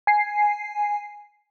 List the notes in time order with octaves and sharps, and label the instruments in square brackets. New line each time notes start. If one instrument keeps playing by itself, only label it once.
[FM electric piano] G#5 C7